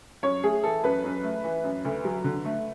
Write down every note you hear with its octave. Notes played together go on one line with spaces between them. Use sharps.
F#2 C#5
A3 G#4
E3 A4
F#2 B4
F#2
A3
E3
F#2
D2
F#3
D3
A3